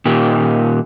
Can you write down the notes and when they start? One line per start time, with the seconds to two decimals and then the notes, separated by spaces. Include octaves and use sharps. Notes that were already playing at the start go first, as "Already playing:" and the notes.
0.05 A#2 D#3 G4